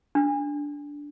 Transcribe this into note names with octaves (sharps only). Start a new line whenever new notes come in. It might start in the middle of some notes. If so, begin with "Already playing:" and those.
D4